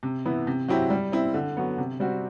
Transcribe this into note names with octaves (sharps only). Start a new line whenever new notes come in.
C3
E3 B3 E4
C3
F#3 C4 E4 G4
G3
C4 E4
D3
F#3 B3
C3
G3 C4 F#4